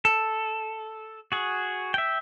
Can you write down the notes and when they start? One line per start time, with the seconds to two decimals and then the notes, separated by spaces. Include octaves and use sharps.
0.05 A4
1.32 F#4 G#4
1.94 E5 G5